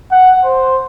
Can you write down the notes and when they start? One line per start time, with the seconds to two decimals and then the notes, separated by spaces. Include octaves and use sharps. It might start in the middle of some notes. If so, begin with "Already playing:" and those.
0.11 F#5
0.44 C5